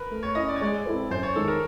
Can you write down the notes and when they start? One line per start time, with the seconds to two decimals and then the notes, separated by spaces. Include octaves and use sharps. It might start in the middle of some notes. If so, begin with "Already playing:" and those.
Already playing: A#4 B4
0.11 A3
0.23 C#5
0.35 C#4 E4 D#5
0.49 D5
0.56 C#5
0.61 G#3 D5
0.85 C4 E4 A4 C5
1.10 F#2 C5
1.23 C#5
1.36 D#3 G#3 A4
1.48 A#4